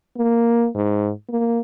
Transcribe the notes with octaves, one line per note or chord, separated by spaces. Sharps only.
A#3
G#2
A#3